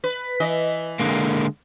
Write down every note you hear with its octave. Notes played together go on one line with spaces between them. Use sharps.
B4
E3 D#5
D3 G#3 A#3